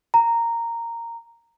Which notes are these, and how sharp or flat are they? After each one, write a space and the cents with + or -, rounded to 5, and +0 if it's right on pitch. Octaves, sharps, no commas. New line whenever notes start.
A#5 -10